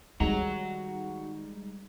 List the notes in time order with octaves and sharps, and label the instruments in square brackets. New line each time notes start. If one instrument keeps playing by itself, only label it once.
[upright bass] D#3 C4 [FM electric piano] G3 G#3 D#4 [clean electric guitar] F#4 F#5 A#5